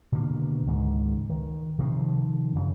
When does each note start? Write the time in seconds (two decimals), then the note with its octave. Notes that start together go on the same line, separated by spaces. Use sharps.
0.12 B2 D3 D#3 A#3
0.66 C#2 G#2 D#3 G#3
1.30 D#3
1.78 C3 D#3 F3 C4
2.55 F#2 C#3